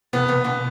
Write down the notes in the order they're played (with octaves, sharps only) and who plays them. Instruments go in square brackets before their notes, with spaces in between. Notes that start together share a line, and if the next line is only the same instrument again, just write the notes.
[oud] C3 E3 [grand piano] B3
[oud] C3 E3
B2 D3